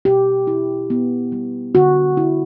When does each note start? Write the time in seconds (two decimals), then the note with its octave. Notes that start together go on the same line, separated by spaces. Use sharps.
0.05 B2 G4
0.47 E4
0.90 B3
1.32 G3
1.75 D3 F#4
2.17 E4